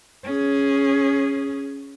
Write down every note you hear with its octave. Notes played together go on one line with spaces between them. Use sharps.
C#4 G#4